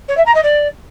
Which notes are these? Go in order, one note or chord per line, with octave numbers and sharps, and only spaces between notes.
C#5
E5
A#5
D#5
D5